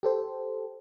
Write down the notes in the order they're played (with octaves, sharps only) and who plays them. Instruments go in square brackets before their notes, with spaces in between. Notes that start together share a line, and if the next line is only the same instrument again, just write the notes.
[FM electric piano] G4 A4 C5